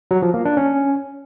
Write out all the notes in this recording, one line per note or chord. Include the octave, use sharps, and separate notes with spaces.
F#3
F3
A#3
D4
C#4